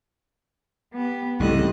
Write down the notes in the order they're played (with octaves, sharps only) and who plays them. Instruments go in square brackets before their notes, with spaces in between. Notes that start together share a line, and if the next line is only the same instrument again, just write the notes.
[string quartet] B3 G4
[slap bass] C2 C#3 [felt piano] G#2 E3 G3 [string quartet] A4 D#5 F#6